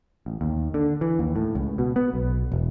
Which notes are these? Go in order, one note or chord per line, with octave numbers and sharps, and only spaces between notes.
A1
D#2
D3
E3
D#2
A2
C#2
B2
B3
B1
E1